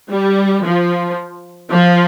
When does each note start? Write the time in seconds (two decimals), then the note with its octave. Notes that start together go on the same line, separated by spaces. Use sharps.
0.10 G3
0.64 F3
1.71 F3